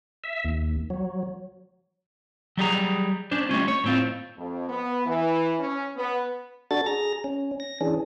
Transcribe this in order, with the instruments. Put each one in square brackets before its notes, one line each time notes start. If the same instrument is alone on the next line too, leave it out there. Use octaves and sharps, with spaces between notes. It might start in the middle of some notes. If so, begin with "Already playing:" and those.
[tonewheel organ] E5
D#2
F#3
[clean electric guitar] F#3 G3 G#4 A#5
C#4 D4 C5
G3 A3 C#4 F4
C#5
A2 C4 F4
[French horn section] F2
B3
E3
C#4
B3
[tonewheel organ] D4 F#4 A4 A6
G#4 A#5 A#6
C#4
A#6
E3 C#4 D4 G#4